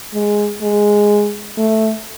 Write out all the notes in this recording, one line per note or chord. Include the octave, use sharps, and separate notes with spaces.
G#3
G#3
A3